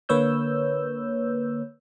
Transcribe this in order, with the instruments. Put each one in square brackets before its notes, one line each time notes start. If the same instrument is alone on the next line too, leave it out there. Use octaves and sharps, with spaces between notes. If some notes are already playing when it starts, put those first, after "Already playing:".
[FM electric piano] D3 A#3 B4 C#5 E6 G6